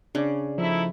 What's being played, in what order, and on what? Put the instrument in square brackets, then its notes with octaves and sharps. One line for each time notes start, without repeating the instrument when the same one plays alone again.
[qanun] C#3 [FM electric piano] D4 D5
[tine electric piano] F3 [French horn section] A3 D#4 E4